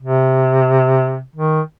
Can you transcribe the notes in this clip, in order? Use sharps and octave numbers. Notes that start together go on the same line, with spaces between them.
C3
D#3